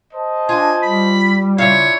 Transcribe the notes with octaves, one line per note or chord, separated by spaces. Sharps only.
C5 D#5 A5
D4 F4 G#5
G3 B5
C#3 D4 E4 F4 C#5 F5